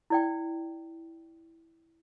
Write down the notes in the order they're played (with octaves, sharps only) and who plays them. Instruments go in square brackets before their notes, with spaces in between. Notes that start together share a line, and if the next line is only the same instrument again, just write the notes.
[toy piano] E4 D5 G5